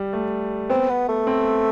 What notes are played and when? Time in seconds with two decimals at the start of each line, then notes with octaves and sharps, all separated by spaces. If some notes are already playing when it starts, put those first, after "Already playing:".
Already playing: G3
0.13 A3
0.70 B3 C4
0.89 B3
1.09 A3
1.27 C4